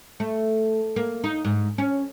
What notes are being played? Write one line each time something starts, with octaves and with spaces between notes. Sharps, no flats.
A3
A#3
D#4
G#2
C#4